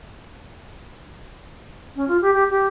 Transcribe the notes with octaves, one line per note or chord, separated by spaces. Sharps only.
C#4
F4
G4
G4
G4